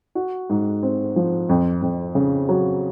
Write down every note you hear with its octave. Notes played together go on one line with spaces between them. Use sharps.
F#4
G#2
C4
F3
F2
F2
C#3
F#3